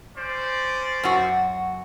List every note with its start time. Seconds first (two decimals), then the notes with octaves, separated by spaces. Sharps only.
0.18 C#4 C5 D5
1.04 F#2 F#4